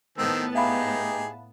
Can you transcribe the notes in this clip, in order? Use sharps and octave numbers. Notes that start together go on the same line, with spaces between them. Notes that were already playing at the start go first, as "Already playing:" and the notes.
A2 D#3 B3 C4 A5 E6
D#4 G4 G#4 E5 F5 B5